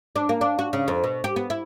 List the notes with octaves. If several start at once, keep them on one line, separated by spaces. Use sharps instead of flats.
D4
A#3
D4
F#4
C#3
F2
B2
G4
B3
E4